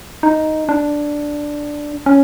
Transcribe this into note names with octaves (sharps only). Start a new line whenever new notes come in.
D#4
D4
C#4